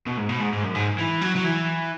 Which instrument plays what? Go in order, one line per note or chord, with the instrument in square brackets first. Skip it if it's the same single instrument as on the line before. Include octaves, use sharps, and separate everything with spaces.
[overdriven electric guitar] B2
G#2
B2
G#2
G#2
F#2
G#2
E3
F#3
F#3
E3